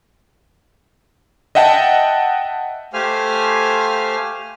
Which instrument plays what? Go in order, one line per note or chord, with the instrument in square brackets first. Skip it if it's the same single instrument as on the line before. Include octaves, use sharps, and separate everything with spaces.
[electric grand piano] D#5 E5 F#5 G5 A5
[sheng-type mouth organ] A3 G4 C5 F5 G#5 F6